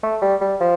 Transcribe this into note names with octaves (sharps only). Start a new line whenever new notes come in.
A3
G3
G3
F3